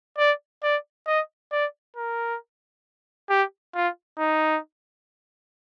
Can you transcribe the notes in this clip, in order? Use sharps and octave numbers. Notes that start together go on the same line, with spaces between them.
D5
D5
D#5
D5
A#4
G4
F4
D#4